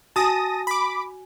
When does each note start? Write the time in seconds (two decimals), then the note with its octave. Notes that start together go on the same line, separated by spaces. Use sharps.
0.16 F#4 G#5 A5 D#6 A#6
0.67 B5 D6